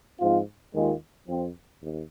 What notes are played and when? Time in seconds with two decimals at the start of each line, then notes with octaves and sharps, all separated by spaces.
0.20 G#2 F3 C4 F4
0.73 D#2 D#3 G#3 F4
1.28 F2 F3 C4
1.81 D#2